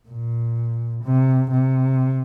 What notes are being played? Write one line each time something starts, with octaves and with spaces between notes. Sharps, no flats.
A#2
C3
C3